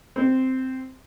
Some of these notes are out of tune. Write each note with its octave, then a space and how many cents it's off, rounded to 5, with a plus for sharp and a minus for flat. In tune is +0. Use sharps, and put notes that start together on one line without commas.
C4 -5